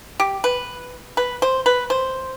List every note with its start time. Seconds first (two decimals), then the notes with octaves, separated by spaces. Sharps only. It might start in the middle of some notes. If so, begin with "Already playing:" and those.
0.20 G4
0.44 B4
1.17 B4
1.42 C5
1.66 B4
1.90 C5